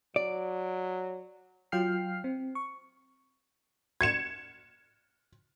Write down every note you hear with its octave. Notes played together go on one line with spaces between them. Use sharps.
F#3 D5
F#3 F4 G5 F6 C7
C4
C#6
G#6 C#7 E7